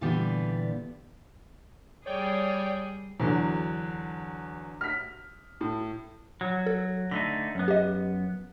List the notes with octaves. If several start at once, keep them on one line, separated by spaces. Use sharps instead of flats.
A#2 D3 E3 G3 B3 G4
G3 G#4 C#5 D5 G5
E2 D3 F#3
F6 B6
A2
F#3
A4
D3 A3 D#4 A#6
F#2 B3
G4 D#5